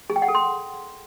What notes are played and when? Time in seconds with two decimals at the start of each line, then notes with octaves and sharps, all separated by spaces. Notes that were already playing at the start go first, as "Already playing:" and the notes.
0.10 G#4
0.16 G5
0.22 F#5
0.28 A4
0.35 C6